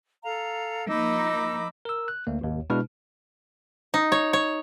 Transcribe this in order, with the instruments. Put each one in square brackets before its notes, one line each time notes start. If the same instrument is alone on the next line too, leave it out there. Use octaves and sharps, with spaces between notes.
[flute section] A4 F5 A#5
[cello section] F3 A#3 D#4 [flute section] B5 D6 E6
[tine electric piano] A#4 E6
F#6
D2 A#3
G#1 D#2
B2 G#3 D4 E4 B4 F6
[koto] D#4
C#5
C#5